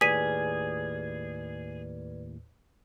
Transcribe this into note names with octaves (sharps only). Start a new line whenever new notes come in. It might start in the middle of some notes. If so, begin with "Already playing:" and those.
D#2 A2 G#4 B4 D5 G#6 B6 D#7